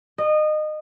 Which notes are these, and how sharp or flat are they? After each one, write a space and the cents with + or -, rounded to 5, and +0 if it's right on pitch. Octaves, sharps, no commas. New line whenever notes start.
D#5 -25